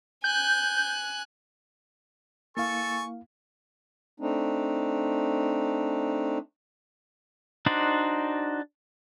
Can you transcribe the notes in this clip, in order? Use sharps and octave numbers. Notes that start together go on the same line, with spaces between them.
G#5 F#6 G6
A#3 E4 A4 F5 G#5 C#6
A3 C4 D4 D#4
D4 D#4 F#4 C5 D5